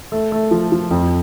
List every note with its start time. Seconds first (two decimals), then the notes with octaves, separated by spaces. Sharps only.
0.12 A3
0.32 A3
0.51 F3
0.72 F3
0.91 F2